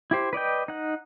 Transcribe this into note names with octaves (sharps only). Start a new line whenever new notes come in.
E4 G4 C5
B4 D5 D#5 G5
D#4 F#5